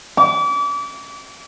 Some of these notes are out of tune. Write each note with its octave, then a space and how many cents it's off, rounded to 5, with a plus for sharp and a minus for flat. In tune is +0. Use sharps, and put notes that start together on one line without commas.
D6 -35